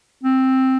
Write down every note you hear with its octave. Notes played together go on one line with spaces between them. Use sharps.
C4